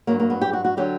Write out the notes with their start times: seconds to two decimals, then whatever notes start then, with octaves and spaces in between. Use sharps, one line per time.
0.07 G2 F#3 A#3
0.20 A#3
0.30 B3
0.41 G4
0.53 F#4
0.65 F#4
0.77 D3 F#3 G4